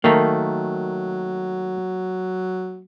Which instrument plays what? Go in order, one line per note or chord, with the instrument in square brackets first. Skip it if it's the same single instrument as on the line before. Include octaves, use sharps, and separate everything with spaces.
[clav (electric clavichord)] D#3 A3 [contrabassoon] F#3 [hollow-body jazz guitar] A#3